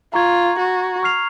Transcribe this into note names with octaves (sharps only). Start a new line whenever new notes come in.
F4 A#5 C#6 G#6
F#4
C#6 F6 C7 F7